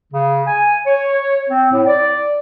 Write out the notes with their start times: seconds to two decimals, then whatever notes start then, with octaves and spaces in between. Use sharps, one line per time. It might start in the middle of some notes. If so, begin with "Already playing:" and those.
0.13 C#3
0.47 G#5
0.86 C#5
1.49 C4
1.72 A2
1.87 D5